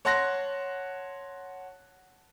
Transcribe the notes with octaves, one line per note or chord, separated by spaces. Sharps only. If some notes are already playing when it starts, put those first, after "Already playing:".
C#5 F#5 A5 C6 F#6 A#6